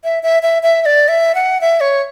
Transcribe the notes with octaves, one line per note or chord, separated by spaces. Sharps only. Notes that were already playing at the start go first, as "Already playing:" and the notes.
E5
E5
E5
E5
E5
D5
E5
F#5
E5
C#5